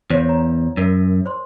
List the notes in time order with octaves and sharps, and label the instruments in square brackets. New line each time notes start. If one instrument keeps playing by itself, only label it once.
[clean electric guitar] E2 [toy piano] C5 C#5 F5
[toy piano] A#5
[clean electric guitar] F#2 [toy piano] A#4 E5
[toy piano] C5 C6